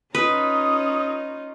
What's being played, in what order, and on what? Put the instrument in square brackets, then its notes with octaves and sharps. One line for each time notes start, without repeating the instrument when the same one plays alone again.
[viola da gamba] C#4 D#4 F4 [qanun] B4 [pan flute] D#6